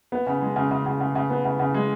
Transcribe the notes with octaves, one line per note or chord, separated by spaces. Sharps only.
B3
C#3
G#3
C#3
C#3
C#3
C#3
C#3
B3
C#3
C#3
G#3